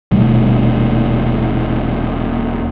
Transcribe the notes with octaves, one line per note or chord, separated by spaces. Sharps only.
D#1 B2 G3 A3